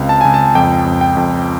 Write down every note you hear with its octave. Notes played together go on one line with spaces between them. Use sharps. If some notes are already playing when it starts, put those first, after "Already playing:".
Already playing: C#2 C4 F5
A5
C#2 G#5
A5
F2 G5
F2
G5
F2